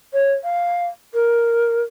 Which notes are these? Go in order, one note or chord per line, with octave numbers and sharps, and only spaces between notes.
C#5
F5
A#4